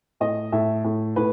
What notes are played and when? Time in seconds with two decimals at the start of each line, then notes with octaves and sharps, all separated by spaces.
0.20 A2 D#5
0.52 A2 E5
0.84 A2
1.16 A2 B4